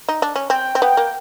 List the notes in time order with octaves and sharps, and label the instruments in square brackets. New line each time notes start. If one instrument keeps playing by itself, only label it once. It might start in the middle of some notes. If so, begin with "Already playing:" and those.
[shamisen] D#4
D4
C#4
[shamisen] C4 [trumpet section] G5
[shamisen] C4
[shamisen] B3 [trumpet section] G5
[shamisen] A#3